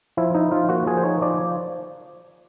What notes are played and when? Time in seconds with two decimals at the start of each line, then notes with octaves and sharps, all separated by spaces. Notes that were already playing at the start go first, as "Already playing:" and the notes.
0.17 F3 E4
0.34 D#4 E4
0.51 F3 F4
0.69 A#3 F#4
0.86 F3 G#4
0.97 C5
1.03 D#4 C#5
1.21 F3 D5